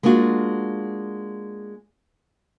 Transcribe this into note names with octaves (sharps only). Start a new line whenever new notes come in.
G#3 A#3 D4 F4 F#4